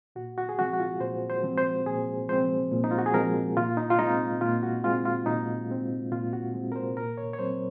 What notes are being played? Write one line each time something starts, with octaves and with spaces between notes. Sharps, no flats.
A#2 F#4
F#4
G#4
F3 G#3 C4 F#4
F#4
F4
A#2 C5
C5
F3 G#3 C4
C5
A#2 G#4
F3 G#3 C4 C5
A#2
D#4
F4
F#4
G#4
F3 G#3 C4 A#4
A#2 F4
D#4
F4
G#3 C4 D#4
A#2 F4
F#4
G#3 C4 F4
F4
A#2 D#4
G#3 C4
A#2 F4
F#4
G#3 C4
A#4
C5
A#2 A#4
C#5
C#5
F#3 C4 C5